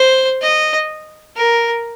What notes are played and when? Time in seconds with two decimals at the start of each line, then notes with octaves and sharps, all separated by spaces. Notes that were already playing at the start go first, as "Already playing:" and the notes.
Already playing: C5
0.41 D#5
1.36 A#4